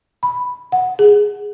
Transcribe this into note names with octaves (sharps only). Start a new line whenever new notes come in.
B5
F#5
G#4